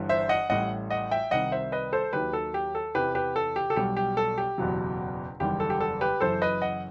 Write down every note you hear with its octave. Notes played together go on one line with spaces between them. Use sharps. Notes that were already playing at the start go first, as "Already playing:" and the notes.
Already playing: G1 G2 E3 G3
C5 E5
D#5 F#5
A1 A2 G3 D#5 F#5
D#5 F#5
E5 G5
C2 C3 D#3 G3 D#5 F#5
C5 E5
B4 D#5
A4 C5
D#2 D#3 F#3 G4 B4
A4
G4
A4
E2 C3 E3 G4 B4
G4 B4
A4
G4
A4
B1 B2 G3 G4
G4
A4
G4
F#1 E2 B2 F#3
F#1 E2 D#3 G3 G4
A4
G4
A4
G4 B4
F#1 F#2 E3 A4 C5
B4 D#5
D#5 F#5